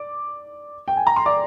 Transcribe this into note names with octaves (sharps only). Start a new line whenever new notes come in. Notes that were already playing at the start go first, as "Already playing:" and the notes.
Already playing: D5 D6
G5
G#5
A#5
C6
D5 D6